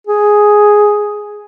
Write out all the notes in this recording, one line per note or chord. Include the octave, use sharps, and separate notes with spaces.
G#4